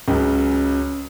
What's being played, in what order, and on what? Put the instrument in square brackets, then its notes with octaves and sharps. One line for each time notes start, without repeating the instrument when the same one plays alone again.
[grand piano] C#2 C#3 F#3